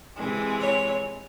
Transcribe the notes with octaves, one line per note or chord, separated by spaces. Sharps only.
C3 E3 G#3
C#5